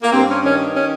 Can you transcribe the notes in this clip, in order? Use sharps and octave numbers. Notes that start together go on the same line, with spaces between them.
A#3
G2 C4
C#4
D#3 C#4
C#4